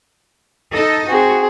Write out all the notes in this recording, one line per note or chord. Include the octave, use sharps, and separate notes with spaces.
D#4 A4 D#5
C4 F#4 G#4